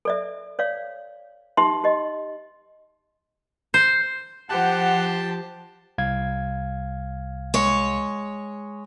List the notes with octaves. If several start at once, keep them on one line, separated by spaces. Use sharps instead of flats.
A4 D5 E5
C#5 D5 F5
D#4 G4 E5 C6
G4 D#5
C5
F3 G4 C5 F#5 A5
C2 F5 G#6
G#3 C#5